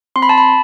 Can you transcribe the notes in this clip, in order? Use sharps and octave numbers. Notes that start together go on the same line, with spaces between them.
C4 C6
B5
A5
B5